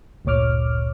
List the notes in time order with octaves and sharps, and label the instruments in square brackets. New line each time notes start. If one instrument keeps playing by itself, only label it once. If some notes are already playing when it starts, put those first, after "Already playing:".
[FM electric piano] G1 D2 A#2 C#5 D6 F6